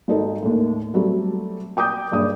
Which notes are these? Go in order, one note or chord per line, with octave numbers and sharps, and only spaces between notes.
G#1 D#4 A4
D#2 A2
F#3 G3 A3 C4
G5 D6 D#6 G6
F#1 G2 D#6